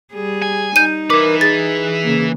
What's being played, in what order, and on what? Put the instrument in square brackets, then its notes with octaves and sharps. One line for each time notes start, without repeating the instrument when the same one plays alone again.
[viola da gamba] G3 G#4
[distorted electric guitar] G#5
[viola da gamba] D#4 [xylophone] G6 D#7
[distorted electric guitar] E3 B4 [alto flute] A#4 [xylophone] D6
[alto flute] G#4 [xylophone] A6
[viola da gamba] C#3 A#3